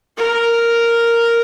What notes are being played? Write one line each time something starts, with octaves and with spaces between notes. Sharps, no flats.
A#4